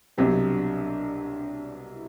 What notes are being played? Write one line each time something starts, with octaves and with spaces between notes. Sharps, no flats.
C2 B2 F#3 C4 D4 G4
E4